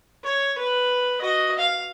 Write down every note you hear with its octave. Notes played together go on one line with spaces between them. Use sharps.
C#5
B4
F#4 D#5
F5